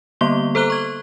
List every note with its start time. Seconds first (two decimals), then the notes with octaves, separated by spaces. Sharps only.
0.21 D3 G3 A#3 B3 C6 G7
0.55 A4 C5 A#5 F#6 G7
0.70 C#6 G#6